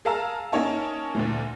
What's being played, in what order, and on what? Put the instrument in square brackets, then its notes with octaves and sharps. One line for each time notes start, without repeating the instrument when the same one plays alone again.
[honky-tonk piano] G#4 A#4 F5 A5 A#5 E6
A#3 C#4 D#4 C#5 A5
D2 A#2 E3